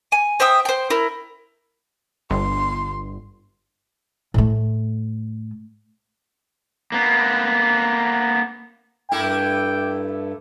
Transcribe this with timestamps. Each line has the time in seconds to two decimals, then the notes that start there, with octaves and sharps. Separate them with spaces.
0.12 G#5
0.40 C5 E5 G5 D#6
0.65 C5 G5
0.90 E4 A#4
2.30 G1 C6
4.34 A2 A3
6.92 A#3 B3
9.12 G2 A3 A#3 E4 G5